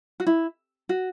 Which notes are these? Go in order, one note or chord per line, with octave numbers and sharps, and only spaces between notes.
F#4
E4
F#4